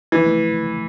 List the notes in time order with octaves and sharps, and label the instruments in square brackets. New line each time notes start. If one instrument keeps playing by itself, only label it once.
[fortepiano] E3 [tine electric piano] F3
[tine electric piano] A3